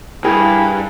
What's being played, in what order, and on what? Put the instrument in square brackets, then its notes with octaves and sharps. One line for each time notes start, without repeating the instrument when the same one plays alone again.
[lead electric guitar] D2 G2 [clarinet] E4 [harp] G#4 A#4 G5